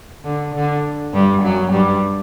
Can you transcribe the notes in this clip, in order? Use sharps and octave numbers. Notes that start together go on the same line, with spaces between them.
D3
D3
G2 G3
F#2 F#3
G2 G3